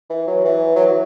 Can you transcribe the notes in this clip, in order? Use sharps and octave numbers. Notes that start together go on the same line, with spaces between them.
E3
F#3
E3
F#3
E3